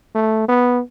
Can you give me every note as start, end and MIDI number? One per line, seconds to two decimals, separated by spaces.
0.15 0.45 57
0.48 0.80 59